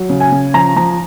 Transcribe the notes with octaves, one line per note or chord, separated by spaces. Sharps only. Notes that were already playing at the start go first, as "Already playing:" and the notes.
Already playing: F#3
C#3
G#5
C#3
F3 A#5
F3 A#5